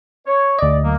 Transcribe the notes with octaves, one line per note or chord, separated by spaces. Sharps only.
C#5
D2 D5 D#5
F#3 A#3